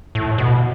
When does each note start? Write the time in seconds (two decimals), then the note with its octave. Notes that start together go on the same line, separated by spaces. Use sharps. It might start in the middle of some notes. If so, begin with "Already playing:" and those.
0.15 A2
0.38 B2